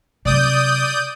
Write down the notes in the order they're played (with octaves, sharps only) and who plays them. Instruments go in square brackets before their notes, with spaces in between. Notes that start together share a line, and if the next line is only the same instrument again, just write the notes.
[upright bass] C3 F#3 [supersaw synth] D5 D#6 G6